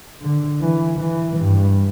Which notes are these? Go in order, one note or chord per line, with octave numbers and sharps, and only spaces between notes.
D3
E3
E3
G2